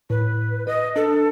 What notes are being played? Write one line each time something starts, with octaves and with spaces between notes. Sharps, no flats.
A2 B4
B4 D#5
D4 A4